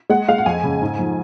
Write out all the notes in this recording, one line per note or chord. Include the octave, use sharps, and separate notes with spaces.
G#3 F#5
G#3 F5
F#5
F2 G#5
C#3
G#2
F3